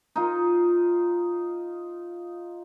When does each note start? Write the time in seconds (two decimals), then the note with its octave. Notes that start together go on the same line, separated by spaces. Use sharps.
0.16 D#4 F4